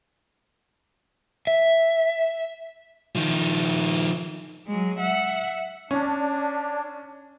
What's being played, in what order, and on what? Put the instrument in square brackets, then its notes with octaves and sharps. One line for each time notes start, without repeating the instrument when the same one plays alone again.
[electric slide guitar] E5
[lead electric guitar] D#3 F3
[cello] F#3 G#3
E5 F#5
[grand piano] C#4 [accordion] D4